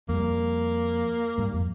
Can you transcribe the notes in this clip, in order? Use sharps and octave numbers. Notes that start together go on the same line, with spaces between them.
F2 G3 A#3
G#2 G3
F2